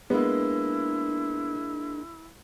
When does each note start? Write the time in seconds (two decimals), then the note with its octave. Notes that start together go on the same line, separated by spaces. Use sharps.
0.10 G#3 A#3 B3 D4 E4